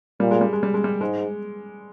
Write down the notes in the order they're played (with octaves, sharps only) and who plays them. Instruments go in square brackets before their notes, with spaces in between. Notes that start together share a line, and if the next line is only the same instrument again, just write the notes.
[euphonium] A#2 [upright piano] G3
[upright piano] G#3
G3
G#3
G3
G#3
G3
[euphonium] G#2 [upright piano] G#3